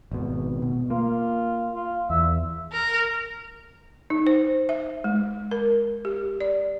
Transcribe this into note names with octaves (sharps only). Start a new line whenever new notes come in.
G#1 B2
B2
A#3 F4
F4
E2 E5
A#4
D#4
C5
E5
G#3
A#4
G4
D5